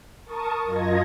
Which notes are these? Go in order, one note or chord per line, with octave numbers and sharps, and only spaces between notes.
A#4 A5 C#6 D#6
F#2 F4 D#5 G#6 A#6